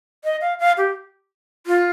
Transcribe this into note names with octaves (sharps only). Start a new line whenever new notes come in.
D#5
F5
F5
G4
F4